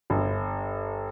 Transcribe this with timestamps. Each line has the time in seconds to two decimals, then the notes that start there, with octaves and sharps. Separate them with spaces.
0.10 G1